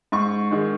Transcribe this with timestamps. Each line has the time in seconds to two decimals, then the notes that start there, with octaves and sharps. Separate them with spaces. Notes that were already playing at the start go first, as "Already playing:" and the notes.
0.12 G#2 C#6
0.51 D#3 G#3